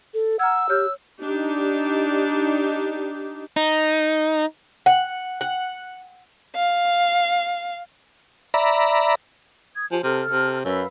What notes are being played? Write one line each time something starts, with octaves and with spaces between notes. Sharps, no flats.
A4
F#5 A#5 E6 F6 G#6
G4 C#5 F6 G6
D4 D#4 G4
D#4
F#5
F#5
F5
D5 E5 A#5 B5
D#6 G#6
F3 F4 G4 G#5
C3 A4 F6
C3
F#2 B4 F5 E6